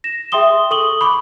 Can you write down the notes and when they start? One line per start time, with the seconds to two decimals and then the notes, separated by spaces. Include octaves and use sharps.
0.04 A#6 E7
0.32 G#4 E5 G5 C6 D#6 G7
0.71 A4 C#6 D#6 F#7 G7
1.01 B5 C#6 D6